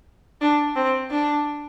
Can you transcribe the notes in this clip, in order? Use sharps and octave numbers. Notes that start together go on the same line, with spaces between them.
D4
C4
D4